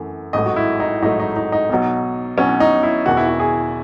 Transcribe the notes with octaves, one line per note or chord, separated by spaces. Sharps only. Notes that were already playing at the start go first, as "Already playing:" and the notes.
Already playing: F#2 E3 A3 F#5
A1 G#2 F#3 A3 D#5
F#4
E4
D#4
A1 G#2 F#3 A3 D#4
D#4
D#4
D#4
B1 B2 F#3
B1 B2 F#3 C#4
D#4
E4
E1 E2 D#3 F#4
E4
F#4
G#4